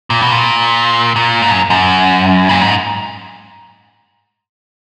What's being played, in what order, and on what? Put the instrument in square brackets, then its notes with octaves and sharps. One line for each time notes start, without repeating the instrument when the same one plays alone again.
[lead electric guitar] A#2
B2
A#2
A#2
G#2
F#2
F#2
A#2
G#2